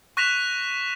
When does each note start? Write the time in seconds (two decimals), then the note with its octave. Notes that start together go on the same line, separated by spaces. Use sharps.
0.17 C#6 F#6 A#6 B6 E7 F7